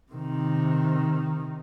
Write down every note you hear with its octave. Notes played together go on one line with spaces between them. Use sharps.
C3 D#3